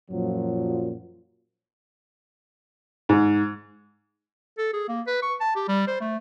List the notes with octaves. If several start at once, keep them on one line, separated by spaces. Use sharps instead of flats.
F#2 A#2 F3 F#3
G#2
A4
G#4
A#3
B4
C#6
A5
G4
G3
C5
A3